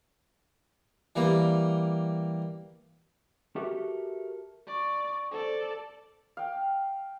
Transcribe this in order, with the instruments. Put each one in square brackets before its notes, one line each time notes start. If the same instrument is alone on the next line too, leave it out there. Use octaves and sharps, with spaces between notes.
[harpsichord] E3 G3 A#3
[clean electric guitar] F#4 G4 A4 A#4 E5
[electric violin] D5 [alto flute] C#6
[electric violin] A4 D5 [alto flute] C5
[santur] F5 G5